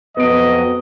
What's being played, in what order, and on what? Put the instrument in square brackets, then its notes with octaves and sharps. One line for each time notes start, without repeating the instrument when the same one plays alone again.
[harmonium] F2 F#3 [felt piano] B3 D7 [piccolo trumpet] D#5